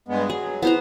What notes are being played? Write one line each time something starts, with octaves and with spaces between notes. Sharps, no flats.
G2 G#3 B3
F#3 G#4
B3 E4 C5 A#5